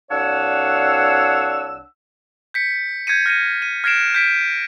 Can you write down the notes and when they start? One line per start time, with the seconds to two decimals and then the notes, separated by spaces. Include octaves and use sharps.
0.10 C2 D4 C#5 F5 F#5 E6
2.54 G6 B6 C#7
3.07 G6 G#6 A#6 C#7 D#7
3.26 F6 A#6 C#7 D#7
3.62 D#7
3.84 F6 G#6 A#6 C7 D7 E7
4.14 G6 B6 D7